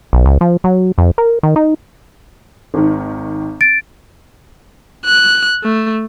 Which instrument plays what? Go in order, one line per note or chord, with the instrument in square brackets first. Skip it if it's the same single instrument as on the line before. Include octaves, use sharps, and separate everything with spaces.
[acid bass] B1
C#2
F3
F#3
F2
A#4
D#3
D#4
[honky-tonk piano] G#1 D#3
[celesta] A6 D7
[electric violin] F#6
A3